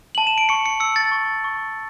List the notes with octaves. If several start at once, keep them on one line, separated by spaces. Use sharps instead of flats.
A5 F#7
E7
D7
C#6 C#7
C#7
E6 C#7
A6
C#6
C#6